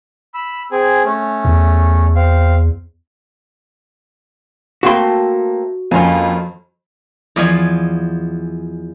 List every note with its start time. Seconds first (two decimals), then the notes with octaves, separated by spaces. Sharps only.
0.34 B5 E6
0.72 C4 G#4 G#5
1.05 A3 C#4
1.45 E2
2.16 C4 F5
4.83 A3 A#3 C4 F#4 C6
5.91 F2 A#3 C#4 F4
7.36 E2 F3 D#5 F5 G#5